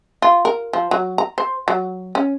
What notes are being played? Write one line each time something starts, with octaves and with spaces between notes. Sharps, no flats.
F4
A#4
F3
F#3
A#5
C5
F#3
C#4